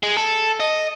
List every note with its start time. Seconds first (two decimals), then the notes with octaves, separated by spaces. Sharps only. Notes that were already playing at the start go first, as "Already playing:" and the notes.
0.03 G#3
0.17 A4
0.60 D#5